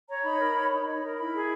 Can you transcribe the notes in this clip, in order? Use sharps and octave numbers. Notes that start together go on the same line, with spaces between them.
C#5 A#5
D#4 B5
A#4
C#5
D#4
D#4
A#4
E4 B5
G#4